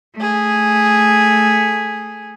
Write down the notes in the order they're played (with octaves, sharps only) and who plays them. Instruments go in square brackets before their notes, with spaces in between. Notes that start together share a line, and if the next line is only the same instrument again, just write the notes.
[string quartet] A3 G#4